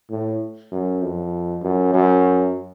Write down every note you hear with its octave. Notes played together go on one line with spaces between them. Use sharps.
A2
F#2
F2
F#2
F#2